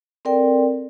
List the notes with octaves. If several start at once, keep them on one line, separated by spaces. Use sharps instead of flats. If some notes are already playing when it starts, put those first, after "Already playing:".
C4 A4 A#4 D5 G5